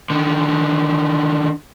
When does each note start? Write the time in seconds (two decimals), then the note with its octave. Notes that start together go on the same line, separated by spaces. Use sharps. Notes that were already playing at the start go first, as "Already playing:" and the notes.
0.10 D3 D#3